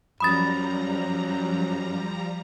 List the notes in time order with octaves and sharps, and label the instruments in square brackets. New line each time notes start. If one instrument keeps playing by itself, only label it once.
[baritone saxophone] F#2 [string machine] F3 G3 A#5 [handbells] B5 D#6 A6